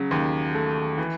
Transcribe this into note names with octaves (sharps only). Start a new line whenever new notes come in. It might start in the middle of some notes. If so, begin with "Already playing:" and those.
Already playing: C#3 F#3
D#2
A3
E3